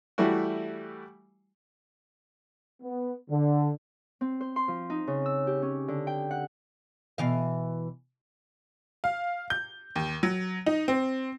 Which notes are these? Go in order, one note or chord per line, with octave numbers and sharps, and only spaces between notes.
E3 G3 A3 E4 F#4
B3
D3
C4
C5
C6
F3
D#4
C#3
E6
G4
C#4
D3
G5
F#5
B2 E3 F5
F5
G6
D#2
F#3
D#4
C4